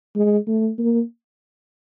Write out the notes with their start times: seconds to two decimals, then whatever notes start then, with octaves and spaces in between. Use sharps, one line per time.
0.16 G#3
0.47 A3
0.78 A#3